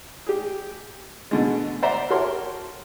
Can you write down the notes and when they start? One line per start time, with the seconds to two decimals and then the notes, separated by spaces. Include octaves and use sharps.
0.27 G4 G#4
1.31 B2 D3 G#3
1.83 C5 D5 E5 F#5 A#5
2.10 F#4 G4 A4 A#4 C#5 C6